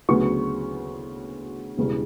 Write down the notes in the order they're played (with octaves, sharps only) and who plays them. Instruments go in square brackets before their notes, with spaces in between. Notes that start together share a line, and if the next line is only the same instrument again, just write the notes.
[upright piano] D2 C#3 F#3 B3 C#6
E1 E2 C#3 G3